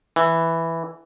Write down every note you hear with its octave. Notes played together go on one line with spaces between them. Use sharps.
E3